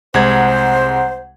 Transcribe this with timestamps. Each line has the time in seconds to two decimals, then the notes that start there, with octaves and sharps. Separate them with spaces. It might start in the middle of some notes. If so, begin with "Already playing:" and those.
0.14 C2 G#3 C5 F#5 A#5 G#6